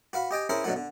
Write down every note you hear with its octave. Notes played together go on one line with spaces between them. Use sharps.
F#4 B4 F5 B5
G4 D#5 G5 G#5
C#4 E4 G#4 A#4 C5 E5
B2 D3 F#3 A3 F#4
D3